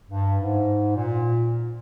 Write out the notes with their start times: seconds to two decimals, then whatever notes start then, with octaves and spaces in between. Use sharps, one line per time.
0.09 G2
0.39 G#2
0.96 A#2